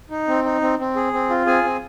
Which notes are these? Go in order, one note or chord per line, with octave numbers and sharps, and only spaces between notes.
D#4
C4
D#4
C4
C4
G#4
C4
F4
C4 G#4 G#5
C4